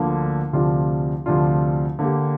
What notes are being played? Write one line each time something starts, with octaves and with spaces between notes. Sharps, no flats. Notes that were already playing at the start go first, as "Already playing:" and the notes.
Already playing: D2 D3 F3 A#3
D2 C3 F3 D4 F4
D2 C3 F3 D4 F4
D3 A#3 G4